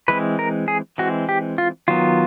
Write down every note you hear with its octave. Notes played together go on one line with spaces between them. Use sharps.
E3 G#3 C4 B4
A#4
G#4
E3 G#3 C4 F#4
G4
F4
D#3 F#3 B3 F4